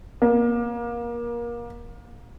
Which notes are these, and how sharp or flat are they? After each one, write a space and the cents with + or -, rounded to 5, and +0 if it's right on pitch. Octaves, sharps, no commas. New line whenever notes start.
A#3 +25